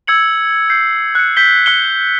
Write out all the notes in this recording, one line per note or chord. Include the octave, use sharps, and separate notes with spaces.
E6 G#6 C#7 F#7
G6 C7
F#6 C#7
G6 B6 G7
F#6 C#7 G7